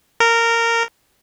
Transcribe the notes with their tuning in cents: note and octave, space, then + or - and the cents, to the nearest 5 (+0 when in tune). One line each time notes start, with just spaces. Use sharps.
A#4 -15